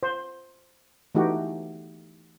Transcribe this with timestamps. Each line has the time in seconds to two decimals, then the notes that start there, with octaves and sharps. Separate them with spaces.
0.03 C5
1.15 E3 A3 D#4 F#4 G4